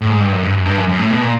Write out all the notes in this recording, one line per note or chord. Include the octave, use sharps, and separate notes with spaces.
A2
G#2
G2
F#2
G2
F#2
G2
F#2
F#2
A2
B2
A#2